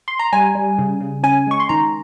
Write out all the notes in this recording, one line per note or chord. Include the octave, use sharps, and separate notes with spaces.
C6
A#5
G3 G#5
G3
C#3
C#3
C#4 G#5
G#3 C#6
C6
D#3 A#5